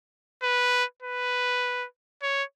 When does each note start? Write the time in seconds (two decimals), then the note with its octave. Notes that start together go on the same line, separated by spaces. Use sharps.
0.43 B4
1.03 B4
2.22 C#5